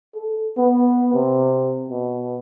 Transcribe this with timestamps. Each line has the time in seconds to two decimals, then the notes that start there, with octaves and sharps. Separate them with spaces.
0.15 A4
0.58 B3
1.14 C3
1.90 B2